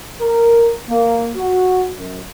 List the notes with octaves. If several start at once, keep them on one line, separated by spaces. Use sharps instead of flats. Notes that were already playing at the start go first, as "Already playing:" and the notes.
A#4
A#3
F#4
F#2